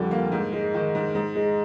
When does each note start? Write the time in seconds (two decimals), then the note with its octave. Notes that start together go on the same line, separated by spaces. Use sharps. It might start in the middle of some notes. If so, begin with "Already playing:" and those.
Already playing: F2 D3 G3
0.11 A#3
0.32 G#2
0.52 G#3
0.74 D#3
0.95 G#2
1.15 G#2
1.35 G#3